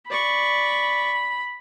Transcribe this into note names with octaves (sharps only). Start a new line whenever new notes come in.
D5 B5 C#6